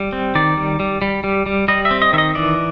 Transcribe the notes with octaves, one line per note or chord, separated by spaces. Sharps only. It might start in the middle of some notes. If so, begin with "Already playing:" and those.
Already playing: G3
C4
D#3 D5
G3
G3
G3
G3
G3
G3 D#5
E5
C4
D#5
D#3 E5
D#5
E3 D5